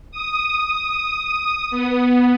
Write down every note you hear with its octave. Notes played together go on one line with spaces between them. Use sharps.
D#6
B3